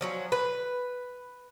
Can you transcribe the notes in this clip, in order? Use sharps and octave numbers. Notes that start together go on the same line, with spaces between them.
F3 F#3 C#4
B4